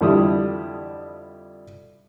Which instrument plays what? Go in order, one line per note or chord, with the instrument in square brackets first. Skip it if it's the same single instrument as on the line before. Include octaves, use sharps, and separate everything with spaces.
[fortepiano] F2 D3 G3 E4 D#6